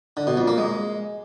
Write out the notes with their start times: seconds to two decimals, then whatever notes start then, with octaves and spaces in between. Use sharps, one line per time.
0.17 D3
0.27 B2
0.37 F2
0.48 A#3
0.58 G#3